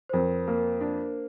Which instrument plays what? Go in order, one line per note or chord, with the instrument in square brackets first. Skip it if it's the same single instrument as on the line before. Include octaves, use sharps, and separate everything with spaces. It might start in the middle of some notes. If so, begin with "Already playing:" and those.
[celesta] C5
[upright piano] F2 [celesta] A#4
[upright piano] A#3 [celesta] A#4
[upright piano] D4